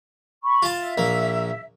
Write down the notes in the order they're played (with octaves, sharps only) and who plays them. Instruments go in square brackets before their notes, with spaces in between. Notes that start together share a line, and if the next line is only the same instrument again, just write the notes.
[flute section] B5 C#6
[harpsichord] F4 A5
[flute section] E5
[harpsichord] A#1 A#3